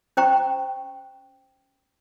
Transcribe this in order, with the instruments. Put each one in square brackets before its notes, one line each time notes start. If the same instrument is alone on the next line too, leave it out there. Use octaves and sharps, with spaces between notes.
[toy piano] C#4 C5 G5 A#5 C#6